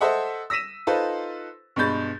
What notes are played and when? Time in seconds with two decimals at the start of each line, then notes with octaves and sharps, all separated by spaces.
0.01 A4 C5 D#5 E5 F#5
0.50 E6 A#6 B6 D#7 E7
0.87 D#4 F4 A4 B4 C5
1.76 G2 B2 G#3 B5 G6 A6